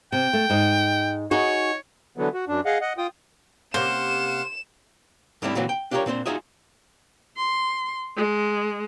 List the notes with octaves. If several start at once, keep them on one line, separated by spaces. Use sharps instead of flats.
C3 G5
A3
G#2 D#5
D#4 F#4 G#4 C#5
D3 E3 F#3 B3
F#4
F#2 D4
G#4 D#5 F5 F#5
D#5 F#5
F4 G5 D#6
C3 A#3 C#4 C5 F5 F#5 E7
G#2 G3 A3 C4 D4 E4
A#2 D3 E3 F#3 C4 F#4
G5
D4 F4 G4 G#4 A#4 C#5
A#2 C4 D4 C5
D#4 F4 F#4 G#4 D#5 E5
C6
G#3